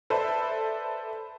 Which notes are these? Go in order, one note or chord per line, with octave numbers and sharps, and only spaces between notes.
A4 B4 C5 D5 E5